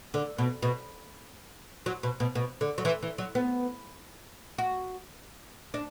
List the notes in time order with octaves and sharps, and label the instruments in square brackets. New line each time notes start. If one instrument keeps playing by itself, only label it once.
[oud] D3
B2
B2
F#3
B2
B2
B2
D3
F#3
E3
E3
F#3
B3
F#4
D4